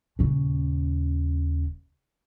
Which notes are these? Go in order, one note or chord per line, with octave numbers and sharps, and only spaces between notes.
D#1 C#3